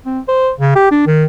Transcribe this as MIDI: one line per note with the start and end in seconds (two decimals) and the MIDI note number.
0.06 0.20 60
0.28 0.50 72
0.60 0.73 49
0.75 0.88 67
0.91 1.02 62
1.07 1.25 51